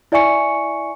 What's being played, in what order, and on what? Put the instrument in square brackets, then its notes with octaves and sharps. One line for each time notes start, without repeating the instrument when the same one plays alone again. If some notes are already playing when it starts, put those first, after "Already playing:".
[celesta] E4 D5 E5 G#5 C#6 C#7